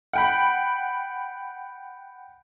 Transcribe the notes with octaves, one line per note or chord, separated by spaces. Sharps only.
F#5 G5 B5